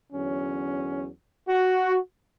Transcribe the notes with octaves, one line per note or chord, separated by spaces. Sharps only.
E2 D3 F#3 C#4
F#4